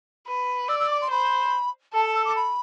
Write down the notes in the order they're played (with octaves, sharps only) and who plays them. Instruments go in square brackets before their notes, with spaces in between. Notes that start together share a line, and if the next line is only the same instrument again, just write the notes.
[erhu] B4
[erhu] D5 [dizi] E6
[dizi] E6
D6
C6
[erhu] C5 [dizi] B5
[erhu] A4 [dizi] A5
[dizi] A5
E6
D6
B5